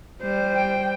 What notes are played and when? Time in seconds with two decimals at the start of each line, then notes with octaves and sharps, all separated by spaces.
0.22 G3 C5
0.56 G5